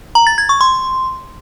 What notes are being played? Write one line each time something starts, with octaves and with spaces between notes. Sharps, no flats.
A#5
A6
G#6
C#6
C6